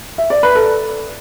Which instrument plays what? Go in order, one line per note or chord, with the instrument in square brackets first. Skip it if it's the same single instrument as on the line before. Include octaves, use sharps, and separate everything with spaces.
[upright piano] E5
D5
B4
A4